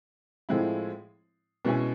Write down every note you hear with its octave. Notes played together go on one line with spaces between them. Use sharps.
A2 F3 G#3 C4 E4
B2 G#3 C#4 E4 G#4